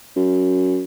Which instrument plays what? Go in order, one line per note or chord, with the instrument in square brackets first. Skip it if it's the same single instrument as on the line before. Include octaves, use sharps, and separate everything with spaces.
[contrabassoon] F#2